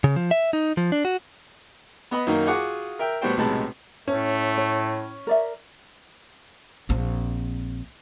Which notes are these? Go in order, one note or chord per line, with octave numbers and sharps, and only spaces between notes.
C#3
F3
E5
D#4
F3
D4
F#4
B3 D#5 B5
F#2 D#3 A#3 D#4
F4 F#4 G#4 F#5 D6
A#4 E5 G5
A2 G3 B3 F#4 C5 G5
B1 A2 C3 G#3 A5 B5
A2 A3 C#4
C#5
A#4 D5 E5
A#1 C4